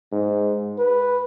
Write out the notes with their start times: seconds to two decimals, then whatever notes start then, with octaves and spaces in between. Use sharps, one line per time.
0.12 G#2
0.79 B4